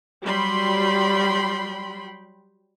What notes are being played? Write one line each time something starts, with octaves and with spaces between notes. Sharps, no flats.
F#3 G3 G5 B5 C6